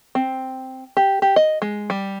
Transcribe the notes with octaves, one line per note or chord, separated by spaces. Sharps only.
C4
G4
G4
D#5
G#3
G3